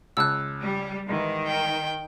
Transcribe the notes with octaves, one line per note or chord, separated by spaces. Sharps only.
C#2 A5 E6 F#6
G3
G#2 D#3 E3
G5